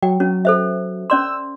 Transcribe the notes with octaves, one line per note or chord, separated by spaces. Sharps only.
F#3 G5
F#3 C#4
A4 C5 E5
C#4 D5 C6 E6